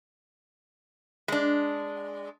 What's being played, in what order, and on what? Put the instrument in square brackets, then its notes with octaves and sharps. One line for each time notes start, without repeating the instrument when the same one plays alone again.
[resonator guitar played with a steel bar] G#3 D4